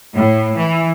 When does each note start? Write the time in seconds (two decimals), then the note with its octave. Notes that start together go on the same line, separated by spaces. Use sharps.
0.14 A2
0.57 E3